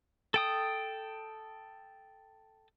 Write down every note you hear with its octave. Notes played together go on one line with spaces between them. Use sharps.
A4 G5 D#6